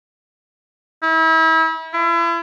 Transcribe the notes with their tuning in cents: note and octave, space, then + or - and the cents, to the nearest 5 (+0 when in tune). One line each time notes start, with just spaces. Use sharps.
E4 -35
E4 +40